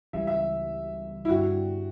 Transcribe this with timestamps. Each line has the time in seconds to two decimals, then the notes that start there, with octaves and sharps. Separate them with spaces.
0.13 C#2 C#3 E3 G3 E5
0.27 E5
1.25 E4
1.29 G2 D3 G3 D4 F#4 G4